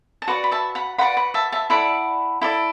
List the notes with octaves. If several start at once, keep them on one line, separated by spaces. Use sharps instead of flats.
A5
F#4 B4 D5 F#5
B5
E5 A5
F#5 B5
F#4 B4 D5 F#5 B5
F#5 B5
E5 A5
E5 A5
E4 A4 D5 F#5 B5
E4 A4 D5